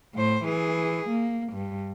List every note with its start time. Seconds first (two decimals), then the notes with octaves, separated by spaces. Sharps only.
0.15 A2 C5
0.44 E3 G#4
1.09 A#3
1.53 G2